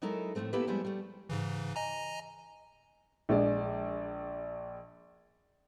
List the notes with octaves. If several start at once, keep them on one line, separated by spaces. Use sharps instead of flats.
F#3 G#3 D#4 E4 A4 A#4
A2 F3 G#3 A3 C4
A#3 B3 E4 G4 A4 B4
F3 G3 G#3 B3 E4
G3 A3
G#2 C#3 E3
D#5 G#5 A#5
A#1 G#3 D5